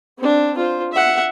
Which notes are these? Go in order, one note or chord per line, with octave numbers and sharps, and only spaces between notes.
C4 D4
F4 C5
E5 F#5